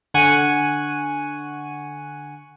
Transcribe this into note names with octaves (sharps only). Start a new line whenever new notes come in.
D3 F#5 G#5 C#6 D#7